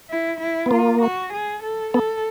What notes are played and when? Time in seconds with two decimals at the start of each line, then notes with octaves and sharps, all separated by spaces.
0.10 E4
0.40 E4
0.66 B3
0.71 A#3 F4
1.02 F#4
1.33 G#4
1.63 A4
1.94 B3 A4